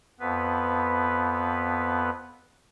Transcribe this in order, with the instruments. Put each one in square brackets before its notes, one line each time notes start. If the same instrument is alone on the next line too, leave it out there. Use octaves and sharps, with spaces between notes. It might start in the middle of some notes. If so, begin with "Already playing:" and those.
[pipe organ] F2 B3 B4